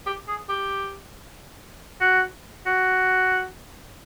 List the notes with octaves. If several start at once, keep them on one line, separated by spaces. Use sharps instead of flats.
G4
G#4
G4
F#4
F#4